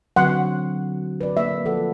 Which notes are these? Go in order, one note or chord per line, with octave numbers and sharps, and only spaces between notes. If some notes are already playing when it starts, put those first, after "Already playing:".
D3 F#3 C4 F#5 C6
B4 D5
A#3 E5
F3 A4 F#5